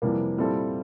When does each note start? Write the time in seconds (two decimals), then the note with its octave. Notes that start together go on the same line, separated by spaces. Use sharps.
0.02 F2 C3 E3 G3 A#3
0.38 A#2 G3 C4 E4 A4